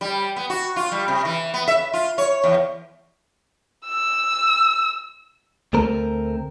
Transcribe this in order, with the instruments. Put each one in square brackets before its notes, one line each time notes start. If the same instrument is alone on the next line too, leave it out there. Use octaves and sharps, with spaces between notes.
[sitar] G3
B3
F#4
F4
G3
C3
E3
B3
E5
F4
C#5
E2
[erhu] E6
[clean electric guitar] D2 A3 C4 A#4